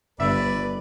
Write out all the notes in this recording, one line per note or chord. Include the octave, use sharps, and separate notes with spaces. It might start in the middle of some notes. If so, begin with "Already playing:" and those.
G1 B4 D5 E5